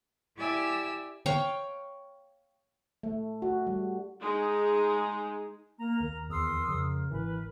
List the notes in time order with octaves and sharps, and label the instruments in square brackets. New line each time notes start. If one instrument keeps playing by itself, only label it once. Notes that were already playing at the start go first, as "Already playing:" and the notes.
[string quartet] E4 G4 D5 E5 G#5 E6
[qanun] C#5 F5 G5 C#6
[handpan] A3
F#4
G3
[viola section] G#3 D#4 G#4
[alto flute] A#3 [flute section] A#5
[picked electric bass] D#2 [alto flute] A#4
[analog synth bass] E2 [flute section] C6 D#6 E6
[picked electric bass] F2 [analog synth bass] C#3
[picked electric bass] G#1 [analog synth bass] E3 [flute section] B4